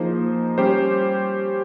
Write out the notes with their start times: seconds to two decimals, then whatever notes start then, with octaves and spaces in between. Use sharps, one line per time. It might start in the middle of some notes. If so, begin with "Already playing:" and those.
Already playing: F3 A#3 D#4 G#4 C5
0.58 G3 C#4 G4 C5